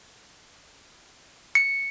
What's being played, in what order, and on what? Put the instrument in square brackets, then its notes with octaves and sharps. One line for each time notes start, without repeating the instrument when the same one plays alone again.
[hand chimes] C#7